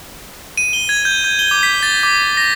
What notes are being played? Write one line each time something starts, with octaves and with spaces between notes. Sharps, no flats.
D#7
G7
G#6
G6
G6
G7
D6
B6
A6
D6
A#6